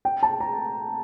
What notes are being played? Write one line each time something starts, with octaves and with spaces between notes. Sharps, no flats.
G5
A5
A#5